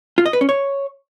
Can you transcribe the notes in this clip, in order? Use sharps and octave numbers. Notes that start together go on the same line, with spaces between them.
F4
D#5
B4
C#4
C#5